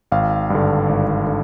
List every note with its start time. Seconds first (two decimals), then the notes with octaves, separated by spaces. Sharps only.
0.12 G#1 F5
0.50 G2 D3
0.89 G#1
1.27 D3